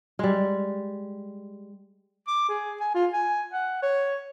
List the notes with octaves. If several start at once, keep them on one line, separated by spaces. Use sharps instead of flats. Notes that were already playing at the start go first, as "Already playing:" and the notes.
G3 G#3
D6
G#4
G#5
F4
G#5
F#5
C#5